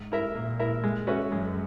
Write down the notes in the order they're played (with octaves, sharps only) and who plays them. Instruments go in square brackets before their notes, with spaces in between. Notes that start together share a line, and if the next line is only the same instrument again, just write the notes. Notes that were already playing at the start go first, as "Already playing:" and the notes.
Already playing: [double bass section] G#2
[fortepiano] E4 A#4 E5
[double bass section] A#2 [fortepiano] A#3
[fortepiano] E4 A#4 E5
G#3
C#4 F#4 B4 E5
[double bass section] F#2 [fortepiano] G#3